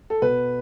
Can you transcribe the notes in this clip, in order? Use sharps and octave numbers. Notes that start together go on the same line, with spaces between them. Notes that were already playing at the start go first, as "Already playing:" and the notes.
A4
B2 B4